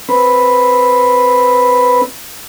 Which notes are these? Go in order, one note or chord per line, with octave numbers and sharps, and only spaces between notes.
C4 B4